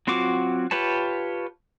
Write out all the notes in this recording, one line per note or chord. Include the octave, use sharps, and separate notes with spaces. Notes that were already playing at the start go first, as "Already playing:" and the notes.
F#3 C4 F4 F#4 D6
F4 G4 B4 C#5 A5